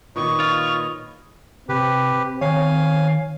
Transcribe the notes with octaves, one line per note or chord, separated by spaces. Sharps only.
A#2 D#3 B4 C#5 D#5 C#6
F4
C3 C4 G4 B4
D#3 C#5 F5 G#5